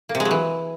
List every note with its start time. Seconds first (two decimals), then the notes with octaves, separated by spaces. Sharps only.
0.09 A#3
0.15 C3
0.20 G#3
0.25 F#3
0.31 E3